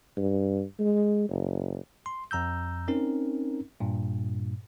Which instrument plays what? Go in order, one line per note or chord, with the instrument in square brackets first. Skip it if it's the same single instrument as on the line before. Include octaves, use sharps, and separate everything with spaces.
[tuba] G2
G#3
F#1
[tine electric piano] C6
F2 A#5 E6 G6
C4 C#4 D#4 A#4
G2 A#2